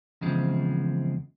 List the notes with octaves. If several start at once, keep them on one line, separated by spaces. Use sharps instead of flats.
E2 C#3 F3 G#3 C4